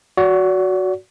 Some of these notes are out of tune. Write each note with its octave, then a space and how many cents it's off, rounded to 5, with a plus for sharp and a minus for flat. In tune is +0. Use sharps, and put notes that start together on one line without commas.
F#4 +0 D5 -40